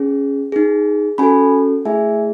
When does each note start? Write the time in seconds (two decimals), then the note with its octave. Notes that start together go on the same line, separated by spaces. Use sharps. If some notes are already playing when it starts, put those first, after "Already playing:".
Already playing: C#4 G#4
0.52 D#4 G#4
1.18 C#4 F#4 A4 G#5 B5
1.85 A3 E4 G#4 E5 G#5